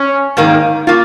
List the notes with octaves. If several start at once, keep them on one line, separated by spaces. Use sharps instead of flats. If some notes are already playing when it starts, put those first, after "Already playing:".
Already playing: C#4
G#2 D#3 A#3 D#4
A#3 F4